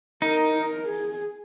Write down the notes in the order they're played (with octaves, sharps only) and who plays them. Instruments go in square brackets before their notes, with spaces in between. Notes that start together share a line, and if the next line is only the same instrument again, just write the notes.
[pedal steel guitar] D#4 [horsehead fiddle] A#4
[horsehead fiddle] A#4
G#4